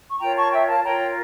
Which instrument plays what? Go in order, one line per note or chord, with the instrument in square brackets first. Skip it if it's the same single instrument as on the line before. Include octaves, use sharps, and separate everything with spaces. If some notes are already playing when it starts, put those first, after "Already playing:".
[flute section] C#6
F4 A#4 C#5 G5 A#5
A5 C#6
E5 G5
F5 A5
F4 A#4 C#5 G5 A#5